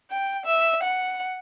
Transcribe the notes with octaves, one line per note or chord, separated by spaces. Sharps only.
G5
E5
F#5